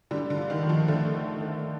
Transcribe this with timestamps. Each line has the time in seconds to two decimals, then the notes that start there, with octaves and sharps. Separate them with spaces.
0.11 D3 G3
0.30 D3
0.37 F4
0.50 D#3
0.63 D#3
0.69 F3
0.88 D3 A3
1.15 A3
1.41 A3